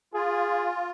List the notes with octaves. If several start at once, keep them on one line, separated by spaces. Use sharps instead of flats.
F4 G#4